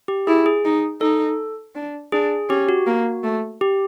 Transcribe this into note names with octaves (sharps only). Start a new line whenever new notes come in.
G4
E4 G#4
G#4
D#4
D#4 A4
D4
D4 G#4
C#4 G4
F#4
A#3
A3
G4